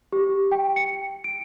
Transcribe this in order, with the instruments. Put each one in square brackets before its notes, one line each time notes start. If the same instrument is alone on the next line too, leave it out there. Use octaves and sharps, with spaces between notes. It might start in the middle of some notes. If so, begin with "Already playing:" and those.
[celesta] G4
G5
C#7
D7